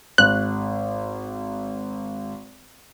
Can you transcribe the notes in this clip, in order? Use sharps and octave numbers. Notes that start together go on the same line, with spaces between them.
G#1 F#6